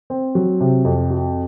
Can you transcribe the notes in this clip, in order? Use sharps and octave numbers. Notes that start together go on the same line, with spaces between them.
C4
F#3
C3
F2
F#4